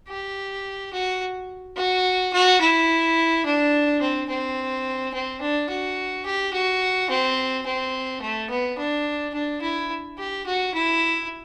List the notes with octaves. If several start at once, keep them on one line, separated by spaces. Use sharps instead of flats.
G4
F#4
F#4
F#4
E4
D4
C4
C4
C4
D4
F#4
G4
F#4
C4
C4
A3
B3
D4
D4
E4
G4
F#4
E4